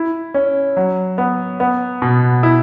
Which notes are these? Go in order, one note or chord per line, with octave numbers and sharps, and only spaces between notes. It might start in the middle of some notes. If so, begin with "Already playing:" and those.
Already playing: E4
C#4
F#3
B3
B3
B2
E4